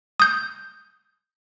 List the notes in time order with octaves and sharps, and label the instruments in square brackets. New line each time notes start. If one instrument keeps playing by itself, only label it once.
[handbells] D#6 G6